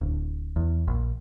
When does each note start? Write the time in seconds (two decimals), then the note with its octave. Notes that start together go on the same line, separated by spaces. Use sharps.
0.01 D1
0.56 E2
0.88 A#1